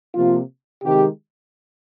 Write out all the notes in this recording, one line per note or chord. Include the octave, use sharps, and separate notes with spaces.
C3 F3 A#3 F4
C3 D#3 G#3 G4